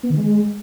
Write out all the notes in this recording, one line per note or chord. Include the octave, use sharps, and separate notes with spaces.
B3
D#3
G#3